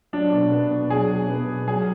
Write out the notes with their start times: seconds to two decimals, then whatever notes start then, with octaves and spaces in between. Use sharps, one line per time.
0.13 F#3 D4
0.32 B2
0.52 B3
0.71 B2
0.90 F#3 G#4
1.10 B2
1.29 B3
1.49 B2
1.68 F#3 G#4